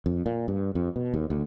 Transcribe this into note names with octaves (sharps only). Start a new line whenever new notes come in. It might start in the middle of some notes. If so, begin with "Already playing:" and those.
F2
A#2
G2
F2
B2
D#2
D2